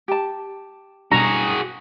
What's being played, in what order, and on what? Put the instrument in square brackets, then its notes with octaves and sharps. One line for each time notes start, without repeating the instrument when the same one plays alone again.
[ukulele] G4 A5
[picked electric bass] B2 G3 D4 [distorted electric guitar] F#4 G#4 [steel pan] A#5